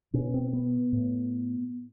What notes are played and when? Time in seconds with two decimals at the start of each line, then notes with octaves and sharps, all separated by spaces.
0.14 B2 C#4
0.34 C4
0.53 B3
0.92 A2